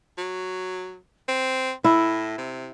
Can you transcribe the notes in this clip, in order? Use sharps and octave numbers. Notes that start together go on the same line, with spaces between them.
F#3
C4
A2 E4
C3